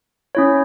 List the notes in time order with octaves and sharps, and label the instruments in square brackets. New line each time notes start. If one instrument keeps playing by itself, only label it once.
[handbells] C#4 E4 C#5